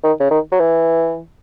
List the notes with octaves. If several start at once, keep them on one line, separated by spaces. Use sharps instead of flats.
D#3
C#3
D#3
F#3
E3